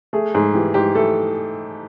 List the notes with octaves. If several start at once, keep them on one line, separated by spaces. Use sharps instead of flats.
A3 G#4
G#2 G#4
E3 G4
G#2 G4
A3 A4